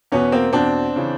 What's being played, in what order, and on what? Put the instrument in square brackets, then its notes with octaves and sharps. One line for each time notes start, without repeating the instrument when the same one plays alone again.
[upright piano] E2 B2 B3 C#4
A#3 C4
E2 B2 C4 D4
C#3 E3